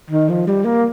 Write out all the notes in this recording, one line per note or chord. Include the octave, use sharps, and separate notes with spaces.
D#3
F3
G3
A#3